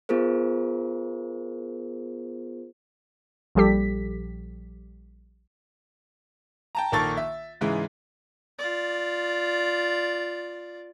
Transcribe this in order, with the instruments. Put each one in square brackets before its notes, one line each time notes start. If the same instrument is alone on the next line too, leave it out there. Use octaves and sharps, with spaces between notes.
[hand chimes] B3 F4 G#4 A#4 C5
[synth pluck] A#1 F3 G3 G4 A4 B6
[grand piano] G5 A5 A#5
A#1 D#3 A#3 A4 C#6 A6
E5
G#2 C#3 E3 G#3
[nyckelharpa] F4 D5